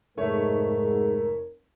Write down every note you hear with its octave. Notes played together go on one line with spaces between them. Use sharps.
F1 G#2 A3 A#4 C#5 E5